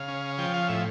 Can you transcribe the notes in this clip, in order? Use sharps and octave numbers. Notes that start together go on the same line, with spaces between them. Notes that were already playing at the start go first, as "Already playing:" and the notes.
Already playing: C#3 F5
C#4
F3 G5
F5
A2 E5